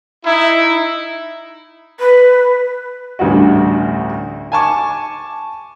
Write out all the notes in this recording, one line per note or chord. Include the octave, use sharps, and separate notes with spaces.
D#4 E4
B4
A1 D2 G2 F#4
G#5 A5 C#6 D6